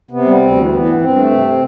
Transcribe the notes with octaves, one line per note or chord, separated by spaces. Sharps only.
C3 B3
G3
D2 C4
E3
E3 B3
G2
G2 C4
A3
C3